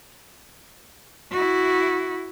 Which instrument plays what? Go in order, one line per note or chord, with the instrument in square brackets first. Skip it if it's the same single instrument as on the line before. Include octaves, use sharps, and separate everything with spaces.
[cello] E4 F#4